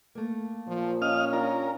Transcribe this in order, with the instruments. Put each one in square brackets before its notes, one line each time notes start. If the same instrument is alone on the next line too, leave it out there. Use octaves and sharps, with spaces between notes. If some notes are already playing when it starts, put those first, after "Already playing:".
[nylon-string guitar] A3 A#3
[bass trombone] A#2 [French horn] F3
[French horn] C#4 [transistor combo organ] D#5 F5 F6
[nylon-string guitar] D4 F4 G4 [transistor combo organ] A#4